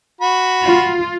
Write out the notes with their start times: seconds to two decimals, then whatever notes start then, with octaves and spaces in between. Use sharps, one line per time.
0.21 F#4 B5
0.65 F4